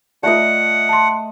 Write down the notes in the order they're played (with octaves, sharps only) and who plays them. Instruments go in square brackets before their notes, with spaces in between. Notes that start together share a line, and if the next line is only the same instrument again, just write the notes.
[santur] A3 D#5 [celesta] F4 D5 [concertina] F#5
[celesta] A5 C6